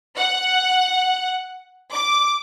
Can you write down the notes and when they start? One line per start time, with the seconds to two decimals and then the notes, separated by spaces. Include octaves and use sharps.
0.18 F#5
1.92 D6